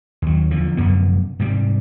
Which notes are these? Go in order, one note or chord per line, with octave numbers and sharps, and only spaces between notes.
D#2 F#3
E2 D3 F3
F1 F#2 D3 B3
G#2 C3 G3